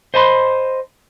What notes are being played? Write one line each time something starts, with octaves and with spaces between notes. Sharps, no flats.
C5 D#5 A5 B5 C6